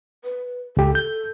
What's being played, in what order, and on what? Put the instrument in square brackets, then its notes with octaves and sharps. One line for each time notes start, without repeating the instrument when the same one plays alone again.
[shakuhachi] B4
[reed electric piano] C#2 G4 [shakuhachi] A4
[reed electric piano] G6